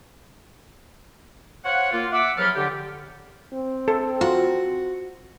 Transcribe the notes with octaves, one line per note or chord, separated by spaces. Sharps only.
C5 C#5 F5 F#5
A#3 F4
E5 F#5 D6
C#2 F3 F#3 A4 B4 F6
D3 G4
C4
A4
F4 F#4